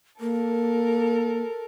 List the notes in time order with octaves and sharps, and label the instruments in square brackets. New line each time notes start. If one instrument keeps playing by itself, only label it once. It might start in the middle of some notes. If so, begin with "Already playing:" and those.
[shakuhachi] A#3 [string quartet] A4 A#4